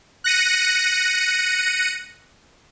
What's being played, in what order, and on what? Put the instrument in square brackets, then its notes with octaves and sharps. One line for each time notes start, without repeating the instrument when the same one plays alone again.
[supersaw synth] F#6 A#6 C#7 D#7